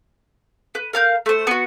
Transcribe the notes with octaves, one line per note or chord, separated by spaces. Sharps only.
B4
A#4 F5 G6
A3 C5
B3 F#4